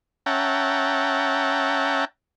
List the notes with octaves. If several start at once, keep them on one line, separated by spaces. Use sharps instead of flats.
C#4 E5 F#5 G5 A5 A#5